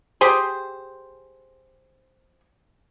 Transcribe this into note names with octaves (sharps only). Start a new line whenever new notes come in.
G4 G#4 C5